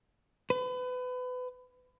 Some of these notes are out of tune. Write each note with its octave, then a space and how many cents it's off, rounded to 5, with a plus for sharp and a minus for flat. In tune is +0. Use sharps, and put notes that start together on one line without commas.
B4 +30